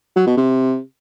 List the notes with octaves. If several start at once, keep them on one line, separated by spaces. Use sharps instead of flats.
F#3
B2
C3